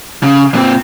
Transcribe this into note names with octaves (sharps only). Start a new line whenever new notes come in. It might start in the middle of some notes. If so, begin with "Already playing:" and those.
C#3
A#2 C4